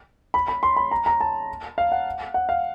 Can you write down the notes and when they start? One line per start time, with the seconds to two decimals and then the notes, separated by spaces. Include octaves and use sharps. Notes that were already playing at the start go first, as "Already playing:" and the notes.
0.34 B5
0.48 B5
0.63 C6
0.76 B5
0.91 A#5
1.06 A#5
1.21 A5
1.78 F5
1.92 F#5
2.34 F#5
2.49 F5